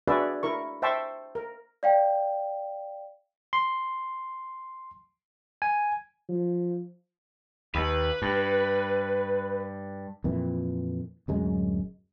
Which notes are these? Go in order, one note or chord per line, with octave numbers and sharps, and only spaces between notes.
D4 F#4 G#4 B4 D5 E5
E4 A#4 C#6
C5 E5 G5 A5 C6 C#6
A#4
D5 F5 G5
C6
G#5
F3
D#2 B4
G2
F2 A#2 E3
D1 F#2 G#3